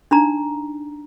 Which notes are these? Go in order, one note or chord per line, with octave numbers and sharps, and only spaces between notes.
D4 D#4 A#5